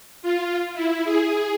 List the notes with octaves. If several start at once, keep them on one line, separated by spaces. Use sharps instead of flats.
F4
E4
G#4